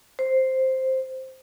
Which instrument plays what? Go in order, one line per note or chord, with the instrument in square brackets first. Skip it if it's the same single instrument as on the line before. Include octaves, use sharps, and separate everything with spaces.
[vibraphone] C5